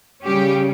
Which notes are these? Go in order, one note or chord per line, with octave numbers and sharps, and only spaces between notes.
C#3 G3 C#4 G4